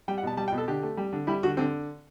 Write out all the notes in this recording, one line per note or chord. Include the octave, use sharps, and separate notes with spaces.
G3 G5
F#5
B2 A5
G3 A5
G5
B2
A4
D3 G4
A3
G3
D3
G3 E4
D3 F#4
D3 C4